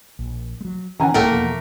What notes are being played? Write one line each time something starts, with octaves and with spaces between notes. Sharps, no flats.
A#1
F#3 G#3
D3 E3 C#4 F#5 G#5 A#5
B1 G#2 B2 A3 A#3 A#4 F#5 G5
E2 B2 F3